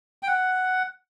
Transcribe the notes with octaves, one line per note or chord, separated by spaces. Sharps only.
G5
F#5